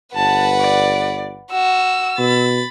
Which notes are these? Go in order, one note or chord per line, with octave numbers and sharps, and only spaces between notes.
G1 B4 F#5 A5
D5
F#4 E6
B2 B5 A6